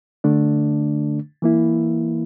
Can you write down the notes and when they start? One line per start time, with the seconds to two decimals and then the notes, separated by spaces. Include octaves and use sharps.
0.24 D3 A3 D4
1.42 E3 A#3 E4